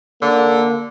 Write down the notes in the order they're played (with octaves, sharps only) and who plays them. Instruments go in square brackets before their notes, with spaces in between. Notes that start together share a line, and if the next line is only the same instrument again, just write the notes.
[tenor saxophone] D3 [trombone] A#3